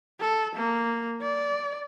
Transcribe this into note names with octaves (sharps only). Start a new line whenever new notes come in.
A4
A#3
D5